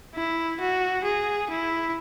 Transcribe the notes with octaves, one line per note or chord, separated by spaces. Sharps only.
E4
F#4
G#4
E4